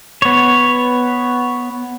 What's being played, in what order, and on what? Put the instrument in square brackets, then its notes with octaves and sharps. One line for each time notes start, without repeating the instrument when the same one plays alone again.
[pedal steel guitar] B3 C#5